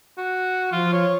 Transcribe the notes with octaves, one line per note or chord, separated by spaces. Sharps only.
F#4
F3 F4
C#5